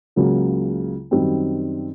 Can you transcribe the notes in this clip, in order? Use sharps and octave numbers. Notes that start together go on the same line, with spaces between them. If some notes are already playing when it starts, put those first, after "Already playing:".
C#2 C#3 F#3 A#3
F#2 D#3 G3 C4